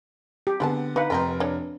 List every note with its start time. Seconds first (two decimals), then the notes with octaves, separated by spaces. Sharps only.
0.47 G4
0.60 D3 G#3 B3 C4 A5
0.96 D#4 B4 F5
1.10 F1 C4 A#4 D#5 G5
1.40 D4 C#5